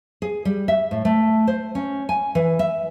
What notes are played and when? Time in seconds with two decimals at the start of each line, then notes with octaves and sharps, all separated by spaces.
0.22 G#4
0.45 G3
0.68 E5
0.91 A2
1.05 A3
1.47 C5
1.75 C#4
2.09 G#5
2.35 E3
2.59 E5